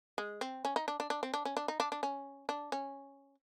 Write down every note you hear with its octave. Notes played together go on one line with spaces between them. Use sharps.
G#3
C4
C#4
D#4
D4
D4
D4
C4
D4
C#4
D4
D#4
D4
D4
C#4
D4
C#4